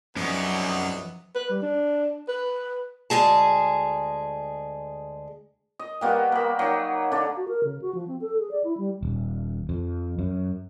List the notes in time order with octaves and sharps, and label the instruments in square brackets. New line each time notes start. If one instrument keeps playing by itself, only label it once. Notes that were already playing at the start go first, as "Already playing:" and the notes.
[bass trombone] C2 [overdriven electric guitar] F#2 [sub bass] F3 [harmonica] F#3 B3 D#4
[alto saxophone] B4
G3
D4
B4
[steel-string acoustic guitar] D2 G#2 G#3 G#4 A5
[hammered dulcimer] D#5
G3 A#3 B3 F#4
A#3 B5
F#3 D#4
D3 D5
[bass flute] F#4
A#4
C#3
F#4
F3
C4
A4
G#4
D5
E4
G3
[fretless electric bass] D#1
F2
F#2